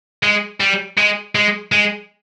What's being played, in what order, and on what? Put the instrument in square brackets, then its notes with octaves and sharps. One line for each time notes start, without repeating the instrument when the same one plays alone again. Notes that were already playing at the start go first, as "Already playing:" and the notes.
[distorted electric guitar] G#3
G3
G#3
G#3
G#3